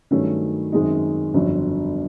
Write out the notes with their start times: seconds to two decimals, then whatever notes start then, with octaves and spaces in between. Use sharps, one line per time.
0.11 G2 D#3 F#3 A3 C#4
0.72 F#2 D#3 G#3 C4 D#4
1.34 G1 F2 D3 F#3